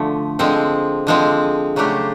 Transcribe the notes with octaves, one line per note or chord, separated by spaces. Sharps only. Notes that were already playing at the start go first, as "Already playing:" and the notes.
Already playing: D3 F3 A3
D3 F3 G#3 C4
D3 F3 G#3 C4
C#3 F#3 A3 D4 G4